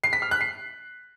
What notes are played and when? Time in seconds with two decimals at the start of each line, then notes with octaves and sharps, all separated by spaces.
0.04 C7
0.13 B6
0.22 F6
0.31 F#6
0.41 C7